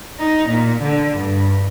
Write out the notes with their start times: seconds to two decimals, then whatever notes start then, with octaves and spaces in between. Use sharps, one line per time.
0.19 D#4
0.49 A#2
0.82 D3
1.17 G2